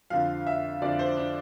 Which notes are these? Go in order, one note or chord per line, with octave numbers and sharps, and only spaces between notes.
F2 D3 F3 F5
E5
F2 D3 F3 D5
C5
D4